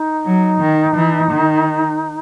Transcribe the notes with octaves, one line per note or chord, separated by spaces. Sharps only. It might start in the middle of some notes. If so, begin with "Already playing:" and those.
Already playing: D#4
F#3
D#3
E3
D#3